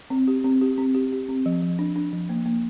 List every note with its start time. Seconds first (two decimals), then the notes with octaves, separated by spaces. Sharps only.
0.10 C4
0.28 G4
0.44 C4
0.61 G4
0.78 C4
0.95 G4
1.12 G4
1.28 C4
1.46 F3
1.62 F3
1.79 D4
1.96 D4
2.13 F3
2.29 A#3
2.46 A#3